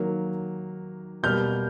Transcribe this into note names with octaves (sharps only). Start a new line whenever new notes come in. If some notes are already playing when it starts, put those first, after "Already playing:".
Already playing: D#3 F#3 A#3
B2 G3 A#3 F6 G6